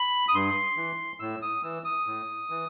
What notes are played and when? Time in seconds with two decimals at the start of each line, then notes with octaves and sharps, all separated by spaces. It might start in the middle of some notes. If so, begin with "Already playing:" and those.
Already playing: B5
0.28 D#6
0.35 G2 C6
0.77 E3
1.20 A2 E6
1.42 D#6
1.63 E3 E6
1.85 D#6
2.07 A2
2.50 E3